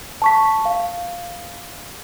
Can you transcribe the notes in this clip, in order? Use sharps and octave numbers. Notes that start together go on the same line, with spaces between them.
A5 C#6 B6
F5